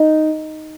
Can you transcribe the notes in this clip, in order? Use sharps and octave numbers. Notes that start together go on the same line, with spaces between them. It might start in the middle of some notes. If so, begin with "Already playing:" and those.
Already playing: D#4